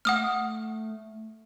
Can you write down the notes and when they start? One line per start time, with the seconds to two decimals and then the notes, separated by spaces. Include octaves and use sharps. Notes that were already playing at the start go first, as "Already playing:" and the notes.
0.05 A3 F#5 D#6 F6